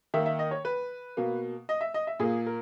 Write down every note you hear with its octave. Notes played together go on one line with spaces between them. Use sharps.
D#3 A#3 E5
E5
D#5
C#5
B4
B2 A#3
D#5
E5
D#5
E5
A#2 A#3 G#4
A#4